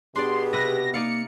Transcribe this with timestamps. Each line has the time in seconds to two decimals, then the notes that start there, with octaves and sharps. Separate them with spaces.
0.16 B2 B3 D4 G4 G#4 D5 C6
0.53 C3 B4 A#6
0.94 A#3 D#4 D5 F5 C#7